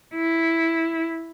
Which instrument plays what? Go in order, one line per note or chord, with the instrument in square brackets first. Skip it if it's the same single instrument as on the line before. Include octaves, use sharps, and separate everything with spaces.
[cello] E4